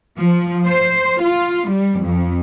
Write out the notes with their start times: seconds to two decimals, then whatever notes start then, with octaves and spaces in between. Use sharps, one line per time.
0.19 F3
0.66 C5
1.24 F4
1.69 G3
2.01 F2